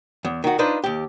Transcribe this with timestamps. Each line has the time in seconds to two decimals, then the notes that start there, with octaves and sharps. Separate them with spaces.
0.25 E2
0.44 D#3 F#4
0.59 D4 D#4 F4 B4 C5
0.84 D#2 G4